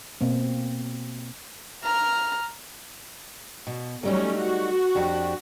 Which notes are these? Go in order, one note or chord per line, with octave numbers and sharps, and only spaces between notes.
B2 A#3 C4
A#5 F6
B2
F#3 G3 A3 C#4 D#4
F#4
F2 D4 G4